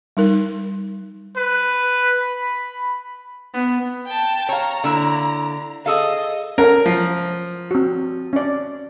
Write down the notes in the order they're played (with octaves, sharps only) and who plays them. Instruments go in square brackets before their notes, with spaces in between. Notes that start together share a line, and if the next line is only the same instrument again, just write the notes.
[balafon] G3 D#4 A#4
[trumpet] B4
B5
[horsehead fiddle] B3
[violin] G5 A5
[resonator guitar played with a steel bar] C#5 F5 [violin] A#5
[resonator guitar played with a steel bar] D3 A#3 E4
[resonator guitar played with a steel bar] G#4 A4 F5 [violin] D#5
[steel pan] C#4 A4 F#5 [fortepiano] A#4
[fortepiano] F3
[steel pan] C4 F#4
C#4 D5